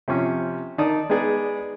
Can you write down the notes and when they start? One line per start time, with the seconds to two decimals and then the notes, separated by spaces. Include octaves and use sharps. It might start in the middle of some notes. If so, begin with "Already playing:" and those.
0.08 C3 F3 C#4
0.78 D#3 D#4 D5 A5 D#6
1.10 G#3 B3 D#4 G#4 D5 D#5